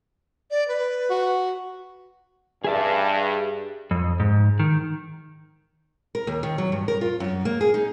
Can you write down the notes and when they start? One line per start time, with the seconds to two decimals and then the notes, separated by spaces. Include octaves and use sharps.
0.51 D5
0.68 B4
1.10 F#4
2.64 G2 G#4 E5 A5
3.91 F2
4.20 G#2
4.60 D#3
6.15 A#4
6.27 D#2
6.43 D#3
6.58 F#3
6.72 G2
6.88 A#4
7.01 F4
7.20 F#2
7.45 A#3
7.61 G#4
7.74 D#4